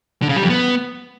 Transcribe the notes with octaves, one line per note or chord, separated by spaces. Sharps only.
D3
C#3
G3
F2
B3